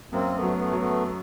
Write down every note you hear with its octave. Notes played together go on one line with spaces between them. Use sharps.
F#2 A#3 C4
A3 B3
F#3
A3 B3
F#3
A3 B3